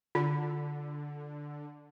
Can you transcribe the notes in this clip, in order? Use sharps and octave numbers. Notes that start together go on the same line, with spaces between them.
D3 F4